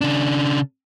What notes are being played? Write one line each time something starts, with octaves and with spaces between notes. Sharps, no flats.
C#3 D4